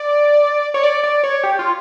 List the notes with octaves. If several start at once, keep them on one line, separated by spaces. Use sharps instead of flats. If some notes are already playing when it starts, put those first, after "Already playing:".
Already playing: D5
C#5
D5
D5
C#5
G4
F4